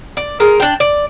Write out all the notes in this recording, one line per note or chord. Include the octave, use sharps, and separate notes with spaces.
D5
G#3 A#4
D4 G5
D5